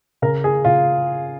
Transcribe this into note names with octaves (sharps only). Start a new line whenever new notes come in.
C#3 A#4
G#4
C#3 F4